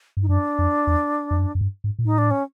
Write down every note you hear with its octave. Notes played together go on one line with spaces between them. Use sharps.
G2
D#4
F#2 D4
F2
E2
F2
F#2
F#2
G2
G#2
A#2
A2 D#4
D4
C#4